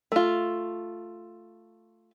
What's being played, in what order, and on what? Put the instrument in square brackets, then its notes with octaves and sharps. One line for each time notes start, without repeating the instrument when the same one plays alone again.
[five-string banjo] A3 F4